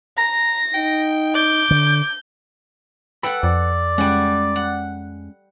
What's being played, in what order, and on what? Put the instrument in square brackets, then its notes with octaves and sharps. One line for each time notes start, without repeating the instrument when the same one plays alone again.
[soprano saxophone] A#5 [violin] A#6
[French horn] D#4 [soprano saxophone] G5
[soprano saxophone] D6 [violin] G6
[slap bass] D3
[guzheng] A4 F#5 [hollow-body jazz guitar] B4 G5 B5
[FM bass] F2 [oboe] D5
[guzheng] G3 F#5 [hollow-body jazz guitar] G#3 C#4
[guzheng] F#5